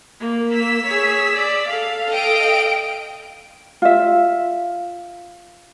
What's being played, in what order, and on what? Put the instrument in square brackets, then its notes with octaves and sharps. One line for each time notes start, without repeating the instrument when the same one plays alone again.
[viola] A#3
[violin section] E6 B6
[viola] G#4 C#5
D5
A4 F5
[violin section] D#5 G5 D7
[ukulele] F4 E5